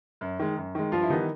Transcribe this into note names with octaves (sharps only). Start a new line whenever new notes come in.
F#2
D#3 G#3
F#2
D#3 G#3
G2 F3 F4
E4
D#3 E3 G3 B3 D#4